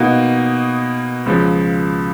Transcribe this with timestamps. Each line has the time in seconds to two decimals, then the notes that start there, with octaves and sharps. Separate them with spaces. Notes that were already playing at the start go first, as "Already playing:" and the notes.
Already playing: B2 A#3 D#4 F#4
1.26 C#2 C#3 F3